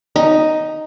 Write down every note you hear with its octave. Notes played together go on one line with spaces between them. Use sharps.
D#4